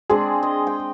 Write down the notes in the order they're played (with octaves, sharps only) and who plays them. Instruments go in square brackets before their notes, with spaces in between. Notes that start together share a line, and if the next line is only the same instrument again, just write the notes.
[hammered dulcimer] G#3 C4 D4 [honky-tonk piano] G#4
[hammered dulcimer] D#5
G5